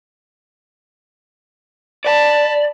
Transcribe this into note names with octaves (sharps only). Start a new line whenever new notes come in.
D5 A5 B5